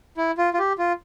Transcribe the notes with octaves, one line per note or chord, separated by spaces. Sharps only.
E4
F4
F4
G4
F4